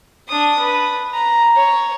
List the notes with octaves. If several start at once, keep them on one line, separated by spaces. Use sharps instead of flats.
D4 D#6
B4
A#5
C#5